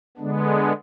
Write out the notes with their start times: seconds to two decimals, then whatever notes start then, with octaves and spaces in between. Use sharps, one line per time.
0.17 D3 G#3 B3 D4